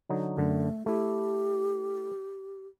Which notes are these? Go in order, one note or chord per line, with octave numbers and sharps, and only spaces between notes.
D3 F#3 D#4
F#2 D3 A3
A3 E4 G4